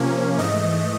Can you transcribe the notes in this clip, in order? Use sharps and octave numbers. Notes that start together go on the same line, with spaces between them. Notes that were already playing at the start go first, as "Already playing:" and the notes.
Already playing: C3 F3 A#3 C#4
G#2 E3 A3 D#5